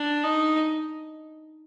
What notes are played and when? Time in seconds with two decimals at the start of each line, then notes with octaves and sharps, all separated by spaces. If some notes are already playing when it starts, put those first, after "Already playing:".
Already playing: D4
0.24 D#4